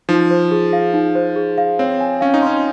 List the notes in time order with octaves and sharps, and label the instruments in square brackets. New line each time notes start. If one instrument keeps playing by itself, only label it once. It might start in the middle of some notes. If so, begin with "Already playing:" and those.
[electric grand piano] F3 [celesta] D#4
[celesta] C5
G#4
F5
D#4
C5
G#4
F5
[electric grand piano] C4 [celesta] C#5
[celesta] G#5
[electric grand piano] C#4 [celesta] F5
[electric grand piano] D#4
[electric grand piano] C#4 [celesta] C6